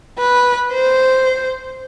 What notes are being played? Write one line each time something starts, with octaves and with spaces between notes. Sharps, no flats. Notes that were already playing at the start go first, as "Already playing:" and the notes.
B4
C5